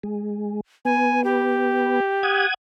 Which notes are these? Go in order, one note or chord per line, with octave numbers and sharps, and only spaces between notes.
G#3
B3 G#5
G4
F#5 D#6 G#6